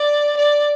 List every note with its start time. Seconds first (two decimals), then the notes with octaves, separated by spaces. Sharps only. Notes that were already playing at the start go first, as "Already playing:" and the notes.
Already playing: D5
0.37 D5